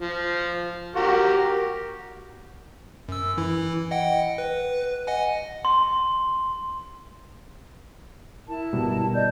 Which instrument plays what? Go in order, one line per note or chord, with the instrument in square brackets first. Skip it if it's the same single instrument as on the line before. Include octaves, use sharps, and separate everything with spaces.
[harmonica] F3
F#4 G4 A#4
[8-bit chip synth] F#2 E6
E3 E4
D#5 F#5 G5
B4
D#5 F#5 G#5
[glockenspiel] C6
[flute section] E4 A#4 A5
[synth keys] G1 B2 G3
[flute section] D5 D#5 G6